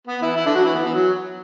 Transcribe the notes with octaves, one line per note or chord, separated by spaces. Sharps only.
B3
E3 E4
E3 E4
D3 D4
F#3 F#4
E3 E4
B3
E3
F#3